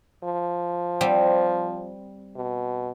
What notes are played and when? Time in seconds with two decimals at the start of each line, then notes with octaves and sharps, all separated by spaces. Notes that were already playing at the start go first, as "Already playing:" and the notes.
0.24 F3
1.01 G3 C4
2.36 B2